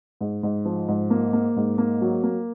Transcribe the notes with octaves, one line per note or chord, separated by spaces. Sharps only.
G#2
G#2
F3
G#2
A#3
A#3
G#2
A#3
F#3
A#3